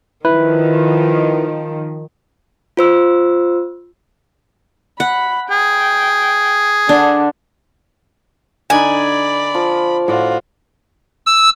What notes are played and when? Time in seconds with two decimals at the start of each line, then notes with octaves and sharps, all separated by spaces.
0.25 D#3 F3 E4 B4
2.77 F4 C5 E6
5.00 F#5 B5
5.50 G#4 G5
6.89 D3 D4
8.70 D3 D#4 D5 G#5 B5
9.55 F3
10.08 A2 F4 F#4 D5
11.26 E6